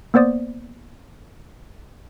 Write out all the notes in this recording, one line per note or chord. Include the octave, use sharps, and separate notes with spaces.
A#3 B3 C5 D5 D#6